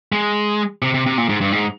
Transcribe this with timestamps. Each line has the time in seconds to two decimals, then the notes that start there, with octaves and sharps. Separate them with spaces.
0.12 G#3
0.82 C3
0.94 C3
1.06 C3
1.17 A#2
1.29 G#2
1.41 G2
1.52 G#2